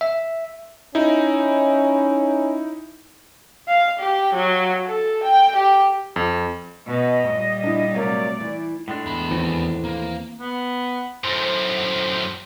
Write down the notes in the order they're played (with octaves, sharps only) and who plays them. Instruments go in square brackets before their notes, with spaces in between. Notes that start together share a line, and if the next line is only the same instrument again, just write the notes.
[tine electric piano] E5
[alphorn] C#4 [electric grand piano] D#4 E4
[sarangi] F5
G4
F#3
A4
G5
G4
[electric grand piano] F2
[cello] B2 [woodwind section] D#5
[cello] A#2 G3
[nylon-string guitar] D4 E4
[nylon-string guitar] C3 F#3 A#3 [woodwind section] A3 D5
[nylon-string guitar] E3
[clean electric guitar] A2 G#3 D4
[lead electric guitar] E2 B5
[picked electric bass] D#2 E3 C4
[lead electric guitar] A#3
[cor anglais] B3
[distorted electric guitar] F#2 A2 [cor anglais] C5
[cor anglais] C5